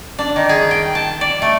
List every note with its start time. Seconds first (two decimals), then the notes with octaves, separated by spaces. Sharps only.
0.19 D4
0.36 D#3
0.49 G#4
0.71 G5
0.95 A5
1.21 D5
1.42 A3